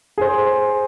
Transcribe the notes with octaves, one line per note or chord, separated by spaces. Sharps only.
G#4 C5